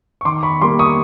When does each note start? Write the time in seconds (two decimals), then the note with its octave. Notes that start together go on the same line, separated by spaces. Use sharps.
0.21 C#6
0.25 D#3 C6 D6
0.43 B5 C#6
0.61 G3 A#3 C6 D6
0.79 C#6 D#6